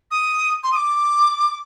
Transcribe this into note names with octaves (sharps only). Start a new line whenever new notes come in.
D#6
C6
D#6
D6